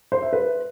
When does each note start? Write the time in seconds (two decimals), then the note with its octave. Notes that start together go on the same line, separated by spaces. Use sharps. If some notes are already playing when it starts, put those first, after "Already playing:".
0.12 C5
0.22 E5
0.33 B4